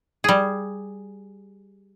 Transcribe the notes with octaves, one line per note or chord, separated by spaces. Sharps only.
G3 G#4